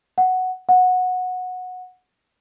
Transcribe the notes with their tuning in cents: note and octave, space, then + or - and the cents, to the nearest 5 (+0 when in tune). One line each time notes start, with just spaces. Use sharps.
F#5 +0
F#5 -15